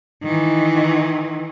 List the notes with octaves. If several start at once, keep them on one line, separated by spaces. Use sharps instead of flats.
D#3 E3